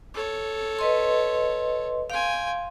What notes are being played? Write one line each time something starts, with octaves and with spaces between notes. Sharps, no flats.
A4 C#5
B4 D#5 C6
F5 G5 G#5 C6